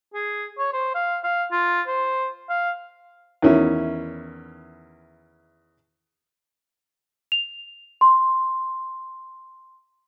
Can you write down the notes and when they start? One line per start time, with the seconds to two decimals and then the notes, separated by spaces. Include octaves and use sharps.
0.14 G#4
0.58 C#5
0.73 C5
0.95 F5
1.24 F5
1.52 F4
1.87 C5
2.49 F5
3.42 E2 D#3 C#4 E4
7.32 F7
8.01 C6